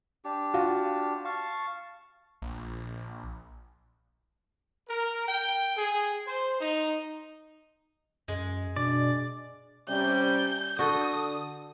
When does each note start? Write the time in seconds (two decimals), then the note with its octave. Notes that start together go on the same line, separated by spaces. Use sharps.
0.25 D4 G4
0.54 F4 F#4
1.25 F5 A5 C#6
2.42 A#1
4.89 A#4
5.28 G5
5.76 G#4
6.26 C5
6.61 D#4
8.28 F#2 G#3
8.76 B2 D4 D5
9.88 C3 G3 C#4 G6
10.79 D3 F#4 A4 D#6